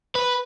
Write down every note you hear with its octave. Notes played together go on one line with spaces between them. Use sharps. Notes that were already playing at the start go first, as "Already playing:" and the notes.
B4